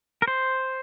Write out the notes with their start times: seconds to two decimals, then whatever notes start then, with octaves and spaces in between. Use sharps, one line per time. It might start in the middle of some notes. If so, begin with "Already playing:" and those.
0.22 A#4
0.28 C5